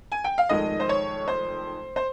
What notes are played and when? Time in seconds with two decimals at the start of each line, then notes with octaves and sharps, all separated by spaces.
0.12 G#5
0.24 G5
0.38 F5
0.49 F1 F2 D#3 G#3 D#5
0.80 C5
0.89 C#5
1.28 C5
1.96 C5